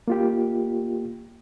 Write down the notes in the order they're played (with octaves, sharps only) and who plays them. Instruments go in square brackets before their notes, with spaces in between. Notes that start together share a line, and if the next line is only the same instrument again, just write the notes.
[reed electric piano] A#3 F4 G4